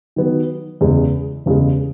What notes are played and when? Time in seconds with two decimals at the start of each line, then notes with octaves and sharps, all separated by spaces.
0.16 D#3 F#3 B3
0.81 E2 C#3 G#3
1.46 E2 C#3 G#3